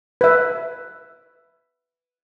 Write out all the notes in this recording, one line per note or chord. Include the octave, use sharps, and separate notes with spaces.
B4 E5